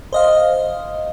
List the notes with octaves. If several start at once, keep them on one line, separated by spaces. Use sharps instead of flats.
C5 D#5 F5